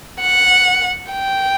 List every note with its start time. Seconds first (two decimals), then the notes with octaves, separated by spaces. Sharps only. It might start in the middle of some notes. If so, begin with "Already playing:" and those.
0.20 F#5
1.13 G5